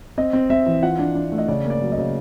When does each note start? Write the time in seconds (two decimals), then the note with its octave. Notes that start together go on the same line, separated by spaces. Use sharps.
0.18 C4 D#5
0.33 C4
0.50 C4 E5
0.66 E3
0.83 F4 F#5
0.99 D4
1.15 D4
1.32 A3
1.38 D#5
1.48 C#3 D5
1.65 A#3
1.70 D5
1.81 F#3
1.92 D#5
1.98 C#3